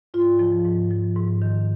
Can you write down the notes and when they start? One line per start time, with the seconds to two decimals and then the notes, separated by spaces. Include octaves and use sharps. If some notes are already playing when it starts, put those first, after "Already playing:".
0.14 G#2 F4
0.39 F3
0.65 G#2
0.91 F3
1.16 G#2
1.42 D#3